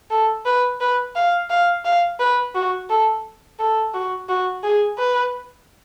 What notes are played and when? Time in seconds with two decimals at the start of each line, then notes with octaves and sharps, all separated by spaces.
0.11 A4
0.46 B4
0.81 B4
1.16 F5
1.50 F5
1.85 F5
2.20 B4
2.55 F#4
2.90 A4
3.59 A4
3.94 F#4
4.29 F#4
4.63 G#4
4.98 B4